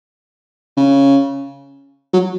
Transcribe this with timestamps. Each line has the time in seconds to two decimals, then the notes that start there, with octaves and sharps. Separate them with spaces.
0.77 C#3
2.13 F#3